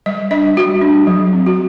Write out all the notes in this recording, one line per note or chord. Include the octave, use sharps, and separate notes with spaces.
G3 D#5
D4 D#5
G3 F#4
D4
F#3
C4
F#4